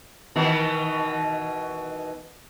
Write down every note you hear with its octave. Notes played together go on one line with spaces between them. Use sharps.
B2 D#3 E3